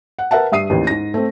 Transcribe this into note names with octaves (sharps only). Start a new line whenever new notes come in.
F#5
A#4 B4 E5 F#5 A5
G2 E5 D#6 C7 D#7
A1 D#2
G#2 A#6
A3 C4